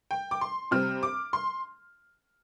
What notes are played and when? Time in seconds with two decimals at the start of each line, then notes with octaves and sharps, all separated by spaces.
0.11 G5
0.31 D6
0.41 C6
0.71 C3 G3 C4 F6
1.03 D6
1.33 C6